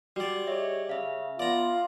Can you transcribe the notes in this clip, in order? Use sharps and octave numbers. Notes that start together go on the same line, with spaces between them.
G3 F#4 G4 D5
G#4 C#5 D#5 E5
C#3 E5 F5
B3 F4 D5 A#5